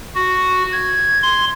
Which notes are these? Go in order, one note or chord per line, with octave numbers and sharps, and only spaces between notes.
F#4
G#6
C6